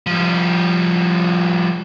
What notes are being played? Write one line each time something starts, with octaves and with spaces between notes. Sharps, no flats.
F3 G3